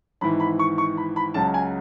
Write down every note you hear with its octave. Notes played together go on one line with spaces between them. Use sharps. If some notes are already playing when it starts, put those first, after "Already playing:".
G#1 G#2 E3 B5
B5
C#6
C#6
B5
B5
C#2 C#3 F#3 A5
G#5